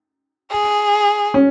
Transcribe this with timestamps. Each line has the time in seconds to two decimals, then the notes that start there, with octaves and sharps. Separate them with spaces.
0.51 G#4
1.34 C#4